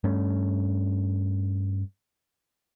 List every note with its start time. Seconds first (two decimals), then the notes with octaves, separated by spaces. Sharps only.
0.04 G2 A3 C#4